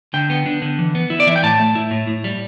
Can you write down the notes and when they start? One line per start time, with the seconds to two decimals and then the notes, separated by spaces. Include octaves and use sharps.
0.14 D3 G5
0.30 B3
0.46 D4
0.62 D3
0.79 E3
0.95 B3
1.10 E4
1.20 D5
1.27 E3 E5
1.36 G5
1.43 A2 A5
1.60 A3
1.75 E4
1.91 A2
2.07 A2
2.24 G3